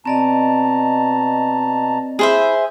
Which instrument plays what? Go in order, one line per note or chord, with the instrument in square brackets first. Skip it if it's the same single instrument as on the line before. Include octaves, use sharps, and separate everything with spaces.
[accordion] B2 A5 A#5 [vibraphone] C4 D5 D#5
[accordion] E4 [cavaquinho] G#4 C5 E5